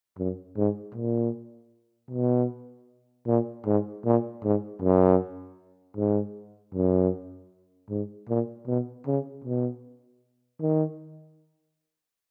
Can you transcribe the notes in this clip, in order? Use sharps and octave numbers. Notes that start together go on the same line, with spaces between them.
F#2
G#2
A#2
B2
A#2
G#2
A#2
G#2
F#2
G#2
F#2
G#2
A#2
B2
C#3
B2
D#3